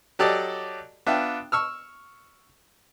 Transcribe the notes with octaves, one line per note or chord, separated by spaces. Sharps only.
F#3 G4 A4 D5 D#5
B3 D4 F4 E5 G5
C#6 E6 F6